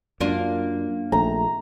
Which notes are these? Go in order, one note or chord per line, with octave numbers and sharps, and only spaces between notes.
F#2 A#3 D4 F4
A#1 A3 A#5